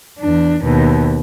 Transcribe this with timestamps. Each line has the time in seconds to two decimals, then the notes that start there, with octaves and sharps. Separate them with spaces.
0.19 E2 D4
0.63 D#2 B2